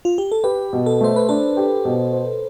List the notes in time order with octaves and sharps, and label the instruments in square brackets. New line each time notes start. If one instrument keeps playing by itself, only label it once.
[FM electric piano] F4
G4
A4
[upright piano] G4 [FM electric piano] B4
[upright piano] B2
[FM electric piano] A4
[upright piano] A3 [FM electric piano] C5
[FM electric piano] B4
[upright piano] D4 [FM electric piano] A4
[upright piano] G4
B2
C5